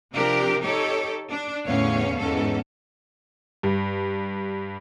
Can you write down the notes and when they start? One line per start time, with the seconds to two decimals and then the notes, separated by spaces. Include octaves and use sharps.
0.13 C3 F3 C4 D4 G4 A#4
0.61 D#4 G4 A4 C#5
1.30 D4
1.65 E2 A2 D3 C#4 C#5 F5
2.18 E2 G#2 C#4 A4
3.63 G2